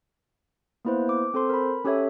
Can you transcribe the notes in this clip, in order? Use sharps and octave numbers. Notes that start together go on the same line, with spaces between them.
A#3 B3 E4 B4 C5
D6
C4 A4 C5 C6
A#4 B5
C#4 G4 A4 C#5 E5